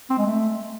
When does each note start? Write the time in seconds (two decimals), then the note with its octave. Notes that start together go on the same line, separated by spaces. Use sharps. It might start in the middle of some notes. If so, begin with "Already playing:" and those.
0.10 C4
0.18 G#3
0.26 A3